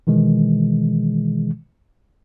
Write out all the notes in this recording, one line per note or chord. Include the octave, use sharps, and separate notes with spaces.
B2 D#3 E3 G#3